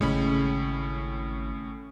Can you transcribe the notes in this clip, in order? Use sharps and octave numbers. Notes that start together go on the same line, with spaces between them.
G#1 A2 C#3 G#3 C#4 B5